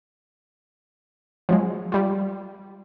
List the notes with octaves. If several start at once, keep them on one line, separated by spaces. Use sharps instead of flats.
F3 F#3 G#3
G3 F4